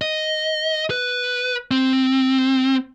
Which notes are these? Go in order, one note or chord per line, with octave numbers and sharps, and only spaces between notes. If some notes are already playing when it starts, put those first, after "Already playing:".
D#5
B4
C4